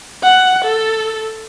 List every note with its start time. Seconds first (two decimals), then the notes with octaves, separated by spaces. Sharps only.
0.23 F#5
0.65 A4